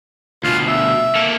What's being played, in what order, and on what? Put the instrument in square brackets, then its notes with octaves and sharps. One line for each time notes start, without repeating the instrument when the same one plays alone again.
[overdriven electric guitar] D2 B2 [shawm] F4
[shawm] E5
[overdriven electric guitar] A#3 A4